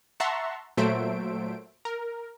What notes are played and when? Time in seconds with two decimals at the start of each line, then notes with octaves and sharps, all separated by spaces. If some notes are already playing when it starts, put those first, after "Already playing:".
0.20 E5 F#5 A5 A#5 C6 C#6
0.77 A#2 F#3 A3 C5 E5 D7
1.85 A#4